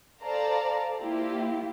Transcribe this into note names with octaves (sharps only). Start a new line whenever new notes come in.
A4 C5 D5 F5 A5 A#5
A#3 E4 F4 G4